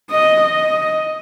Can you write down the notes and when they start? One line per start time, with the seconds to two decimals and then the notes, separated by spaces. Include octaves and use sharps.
0.11 D#5
0.56 D#5